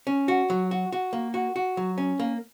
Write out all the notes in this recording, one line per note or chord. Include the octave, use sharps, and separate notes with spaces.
C#4
F#4
F#3
F#4
F#4
A#3
F#4
F#4
F#3
C#4
A#3